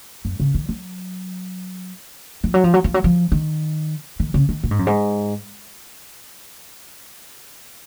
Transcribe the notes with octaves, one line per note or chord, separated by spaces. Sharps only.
F#2
C#3
D#3
F#3
F3
F#3
F3
F#3
F3
F#3
F3
D#3
D#3
C#3
D#3
A#2
G#2
F#2
G#2